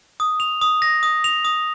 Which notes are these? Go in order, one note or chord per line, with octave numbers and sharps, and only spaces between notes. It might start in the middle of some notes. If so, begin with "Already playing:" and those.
D#6
F7
D#6
A#6
D#6
F7
D#6